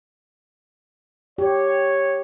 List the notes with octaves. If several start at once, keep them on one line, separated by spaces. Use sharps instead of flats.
G4 C#5